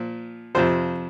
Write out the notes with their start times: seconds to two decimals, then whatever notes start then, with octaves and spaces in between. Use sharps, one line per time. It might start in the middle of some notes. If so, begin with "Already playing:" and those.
Already playing: A#2 F3
0.55 F2 C3 F3 C5